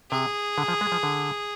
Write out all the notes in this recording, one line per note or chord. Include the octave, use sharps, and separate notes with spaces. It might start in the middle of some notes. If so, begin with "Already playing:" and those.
C3 G#4
D3
F3
G#3
F3
D3